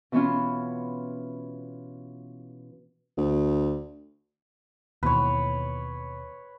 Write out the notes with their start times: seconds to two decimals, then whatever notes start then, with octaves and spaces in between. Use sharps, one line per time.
0.12 B2 E3 B3 C#4 F4
3.17 D2
5.03 D#2 B2 E3 B4 C#5